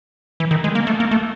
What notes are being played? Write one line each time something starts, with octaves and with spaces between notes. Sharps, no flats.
E3
D#3
G#3
A#3
A3
A#3
A3